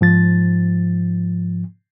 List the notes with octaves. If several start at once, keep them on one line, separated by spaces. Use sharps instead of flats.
G#2 F3 A6